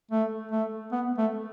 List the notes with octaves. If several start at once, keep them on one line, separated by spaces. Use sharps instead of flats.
A3
A3
B3
A3